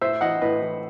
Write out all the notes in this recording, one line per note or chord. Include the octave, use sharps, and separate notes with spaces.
A2 C5 E5
E3 D#5 F#5
A2 B4 D#5
E3